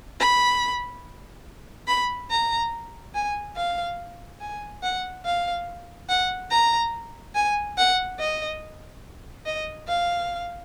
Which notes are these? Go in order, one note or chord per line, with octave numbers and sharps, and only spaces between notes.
B5
B5
A#5
G#5
F5
G#5
F#5
F5
F#5
A#5
G#5
F#5
D#5
D#5
F5